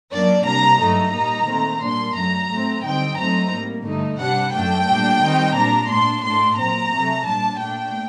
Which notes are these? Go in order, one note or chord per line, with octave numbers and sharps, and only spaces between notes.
F#2 F#3 A#3 D4 D5
C3 G3 D4 A#5
G2 F#3 A3 D#4 A#5
A#2 G3 A#3 D#4
D#3 A3 C4
A#2 G3 A#3 D4 C6
F#2 F#3 A3 A#5
A2 A3 C4
D3 G3 C4 D#4 G5
F#2 F#3 A3 C4 D#4 A#5
A2 G3 A#3
G2 D3 A3 D#4
C3 G3 D4 F#5
F#2 F#3 A3 D4 G5
A#2 G3 D4
D#3 G3 C4 D#4
A#2 G3 D4 A#5
A#2 A3 D4 C6
A2 A3 D4 C6
A#2 F#3 C4 A#5
C3 F#3 A3
A#2 G3 D4 A5
A#2 A3 D4 G5